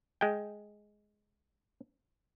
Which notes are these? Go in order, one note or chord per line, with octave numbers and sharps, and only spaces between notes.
G#3 G5